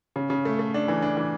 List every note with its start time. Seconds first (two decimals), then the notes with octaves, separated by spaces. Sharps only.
0.16 C#3
0.30 C#3
0.45 A3
0.59 A3
0.74 D4
0.88 E3
1.02 D4
1.17 E3